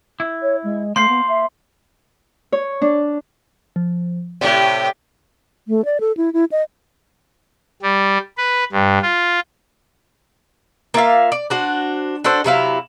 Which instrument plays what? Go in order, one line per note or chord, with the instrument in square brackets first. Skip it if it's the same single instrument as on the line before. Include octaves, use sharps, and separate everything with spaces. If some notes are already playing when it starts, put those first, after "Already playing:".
[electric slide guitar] E4
[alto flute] C#5
G#3
[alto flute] A3 [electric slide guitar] A#3 C5 F5 [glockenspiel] C6
[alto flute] B3
E5
[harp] C#5
D4
[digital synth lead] F3
[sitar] A2 C3 [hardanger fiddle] G4 [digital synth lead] D5
[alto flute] A3
D5
A4
E4
E4
D#5
[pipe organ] G3
B4
G2
F4
[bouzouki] A#3 F4 E5 F5
D5
D4 F#4 C5
D4 F#4 A4 C5
C3 F#3 E4 F5